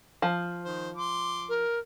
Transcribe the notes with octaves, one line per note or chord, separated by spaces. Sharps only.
F3
D#3 C5
C6 D6
A#4